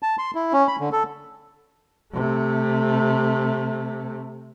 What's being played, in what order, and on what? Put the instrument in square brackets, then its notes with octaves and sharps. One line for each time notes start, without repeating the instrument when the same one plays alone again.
[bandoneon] A5
C6
E4
C#4
B5
D3
A4
[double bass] C3 A3